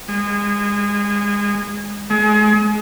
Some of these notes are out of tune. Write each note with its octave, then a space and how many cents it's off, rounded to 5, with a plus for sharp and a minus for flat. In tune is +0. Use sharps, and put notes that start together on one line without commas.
G#3 -25
G#3 +35